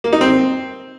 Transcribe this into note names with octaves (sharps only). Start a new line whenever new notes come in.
A#3
D#4
C4